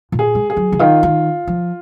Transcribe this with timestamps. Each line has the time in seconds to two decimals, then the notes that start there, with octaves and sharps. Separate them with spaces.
0.12 A#2
0.19 G#4
0.35 G#3
0.50 G#4
0.57 F#3
0.72 C#3
0.79 D#3 F4
1.03 D#3
1.47 F3